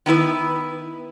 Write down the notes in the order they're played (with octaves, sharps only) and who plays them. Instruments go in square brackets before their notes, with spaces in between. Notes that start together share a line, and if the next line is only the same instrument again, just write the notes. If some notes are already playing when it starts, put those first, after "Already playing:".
[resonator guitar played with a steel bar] D#3 B3 E4 B4